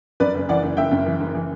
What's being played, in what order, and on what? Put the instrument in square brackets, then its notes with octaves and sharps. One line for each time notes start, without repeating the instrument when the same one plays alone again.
[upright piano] F#2 B4 D5
F#1
E3 D5 F#5
F#1
F#1 E5 G5
F#2
E3
F#1
E3